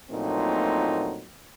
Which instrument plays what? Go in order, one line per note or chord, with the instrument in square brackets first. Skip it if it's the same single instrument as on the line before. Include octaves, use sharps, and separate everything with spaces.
[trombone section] A#1 A#2 F#3 A3 C4 D#4